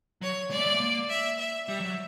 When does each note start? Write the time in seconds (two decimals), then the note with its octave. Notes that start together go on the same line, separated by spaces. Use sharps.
0.21 F#3 C#5
0.51 G#3 D5
0.59 A3
0.66 G#3
0.74 A3
0.80 A#3
1.09 E5
1.39 E5
1.67 G3 E5
1.80 F#3